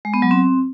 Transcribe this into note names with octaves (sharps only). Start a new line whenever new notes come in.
G#3
B3
F#3
C4